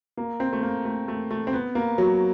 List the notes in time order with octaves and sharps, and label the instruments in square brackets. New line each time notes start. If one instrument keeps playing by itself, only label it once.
[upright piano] A#3
C4
A3
A#3
A3
A3
A3
C4
B3
A#3
F#3